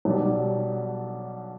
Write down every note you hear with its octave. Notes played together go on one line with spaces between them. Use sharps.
B1 B2 G3